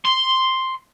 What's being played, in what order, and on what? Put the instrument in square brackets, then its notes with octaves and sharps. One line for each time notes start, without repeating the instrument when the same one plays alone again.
[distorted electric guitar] C6